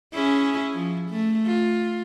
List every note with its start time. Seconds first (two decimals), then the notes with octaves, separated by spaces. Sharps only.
0.13 C#4 E4 G#4
0.73 F3
1.10 A3
1.46 F4